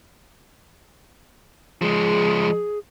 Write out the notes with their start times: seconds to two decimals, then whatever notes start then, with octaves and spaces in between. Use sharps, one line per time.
1.82 F3 G#3 G#4